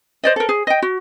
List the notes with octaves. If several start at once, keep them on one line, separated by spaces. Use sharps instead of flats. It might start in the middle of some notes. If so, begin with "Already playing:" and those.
C5 D5 D#5
A4 A#4
G#4
D#5 G5
F#4